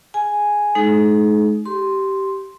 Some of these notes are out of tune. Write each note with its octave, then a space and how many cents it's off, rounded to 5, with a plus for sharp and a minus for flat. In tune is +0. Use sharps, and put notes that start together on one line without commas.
G#4 +0 G#5 +0
G#3 +40 D#4 +0 G#4 +40
G4 -15 C6 +0